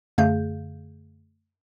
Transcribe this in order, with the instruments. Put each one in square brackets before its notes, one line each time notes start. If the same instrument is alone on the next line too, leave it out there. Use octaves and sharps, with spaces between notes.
[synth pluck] F#2 D3 A3 G#4 F5 G6